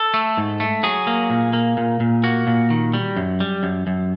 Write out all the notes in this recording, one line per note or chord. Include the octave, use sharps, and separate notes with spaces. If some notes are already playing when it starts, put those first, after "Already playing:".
Already playing: A4
A3
G#2
A3
F#3 G#4
A#3
A#2
A#3
A#2
A#2
A#3 F#4
A#2
D#3
G3
F#2
G3
F#2
F#2